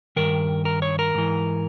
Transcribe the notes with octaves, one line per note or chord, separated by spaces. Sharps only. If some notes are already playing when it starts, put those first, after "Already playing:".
G2 D#3 A#4
A#4
C#5
A#4
G#2 E3